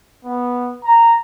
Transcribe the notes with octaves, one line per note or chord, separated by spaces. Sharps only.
B3
A#5